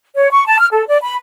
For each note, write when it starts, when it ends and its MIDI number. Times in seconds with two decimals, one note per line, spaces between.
0.16 0.28 73
0.31 0.44 85
0.46 0.59 81
0.60 0.67 89
0.72 0.83 69
0.87 0.98 74
1.02 1.15 83